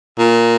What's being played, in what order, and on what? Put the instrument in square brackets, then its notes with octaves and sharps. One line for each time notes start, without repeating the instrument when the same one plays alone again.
[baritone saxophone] A#2